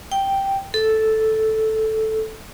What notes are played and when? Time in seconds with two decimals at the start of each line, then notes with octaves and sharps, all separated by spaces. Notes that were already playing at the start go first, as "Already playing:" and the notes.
0.12 G5
0.74 A4